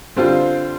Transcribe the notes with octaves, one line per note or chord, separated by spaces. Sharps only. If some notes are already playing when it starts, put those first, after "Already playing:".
D3 G3 C4 F4 C5